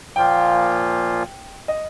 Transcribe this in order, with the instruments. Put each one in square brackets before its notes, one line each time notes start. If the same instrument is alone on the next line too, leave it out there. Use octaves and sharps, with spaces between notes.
[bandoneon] A#2 F3 A#3 F4 [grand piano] G5
[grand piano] D#5